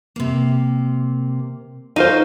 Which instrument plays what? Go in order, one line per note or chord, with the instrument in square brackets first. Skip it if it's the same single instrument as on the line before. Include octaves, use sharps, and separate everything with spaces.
[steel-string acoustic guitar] C3 A#3
[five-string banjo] D#4 F4 C5 [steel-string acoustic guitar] F#4